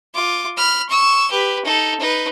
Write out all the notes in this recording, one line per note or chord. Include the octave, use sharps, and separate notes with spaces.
F4 D6
B5 F6
C#6 E6
G4 B4
D#4 A4
D#4 B4